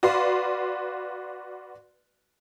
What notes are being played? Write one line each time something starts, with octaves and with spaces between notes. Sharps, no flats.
F#4 B4 D5 F5 C6